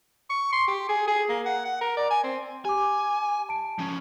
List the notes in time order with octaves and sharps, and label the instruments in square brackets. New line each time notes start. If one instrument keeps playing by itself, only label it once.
[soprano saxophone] C#6
C6
G4
G#4
G#4
A#3
F#5
F#5
A#4
D5
G#5
C4
[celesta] G4 D6 [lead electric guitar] G#5
[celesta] A5 D7
[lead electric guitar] F3 C#4